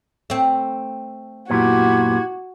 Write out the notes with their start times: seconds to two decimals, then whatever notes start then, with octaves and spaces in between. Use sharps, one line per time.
0.30 A3 C4
1.50 F#2 A#2 B3 E4 F#4 G4 G#6